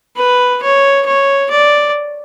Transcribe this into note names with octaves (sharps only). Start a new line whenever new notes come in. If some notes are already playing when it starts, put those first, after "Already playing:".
B4
C#5
C#5
D5